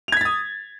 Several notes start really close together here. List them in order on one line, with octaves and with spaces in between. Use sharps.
F7 G#6 B6 A6 D#6